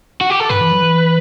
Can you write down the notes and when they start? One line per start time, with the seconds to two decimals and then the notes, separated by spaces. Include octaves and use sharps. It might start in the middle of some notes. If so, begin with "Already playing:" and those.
0.21 F#4
0.30 G4
0.40 A4
0.49 G2 B4
0.61 E3
0.71 F#3
0.82 E3